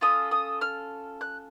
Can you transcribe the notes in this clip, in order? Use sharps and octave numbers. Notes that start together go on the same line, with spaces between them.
C#4 F4 A4 D#6
D#6
F6
F#6